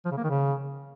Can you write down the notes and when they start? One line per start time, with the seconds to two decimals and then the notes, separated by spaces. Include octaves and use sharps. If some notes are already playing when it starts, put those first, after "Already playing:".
0.05 F3
0.11 C#3
0.17 A#3
0.24 D#3
0.30 C#3